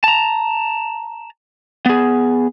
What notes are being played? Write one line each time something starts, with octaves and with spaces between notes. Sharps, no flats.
A5 A#5
B3 G#4